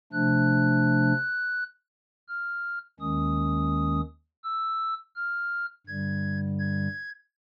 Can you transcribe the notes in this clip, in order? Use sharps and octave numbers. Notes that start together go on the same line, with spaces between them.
C3 F3 A3 D4 F#6
F6
D#2 D#3 G#3 C#4 D#6
E6
F6
G2 D3 G3 G#6
G#6